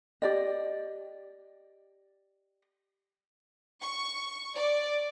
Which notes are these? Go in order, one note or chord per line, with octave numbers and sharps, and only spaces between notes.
G4 D5 D#5
C#6
D5